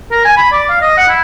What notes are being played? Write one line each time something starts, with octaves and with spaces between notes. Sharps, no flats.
A#4
G#5
B5
D5
F5
D#5
F#5
E4